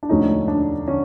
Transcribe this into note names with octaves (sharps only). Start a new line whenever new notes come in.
D4
E1 D2 D3 F3 A3 C#4 D#4
D4
D3 C#4